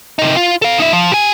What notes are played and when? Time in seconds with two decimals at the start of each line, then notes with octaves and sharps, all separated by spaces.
0.19 C3 D#4
0.36 F4
0.62 A4 F5
0.78 D#4 E5
0.93 F3
1.12 G4 G#5